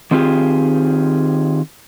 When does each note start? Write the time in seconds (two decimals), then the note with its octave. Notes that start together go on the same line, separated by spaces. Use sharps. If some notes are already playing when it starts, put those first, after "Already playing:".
0.11 D#3 C4 F4 G4 G#4